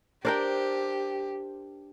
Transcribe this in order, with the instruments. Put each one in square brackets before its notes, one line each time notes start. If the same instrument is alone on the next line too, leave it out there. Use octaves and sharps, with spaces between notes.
[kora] D4 A#4 G5 [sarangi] G4 [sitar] C5